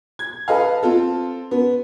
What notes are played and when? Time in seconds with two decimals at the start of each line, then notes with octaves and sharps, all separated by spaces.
0.19 G#6
0.48 A4 B4 D#5 F5
0.83 C4 F4 A4
1.51 B3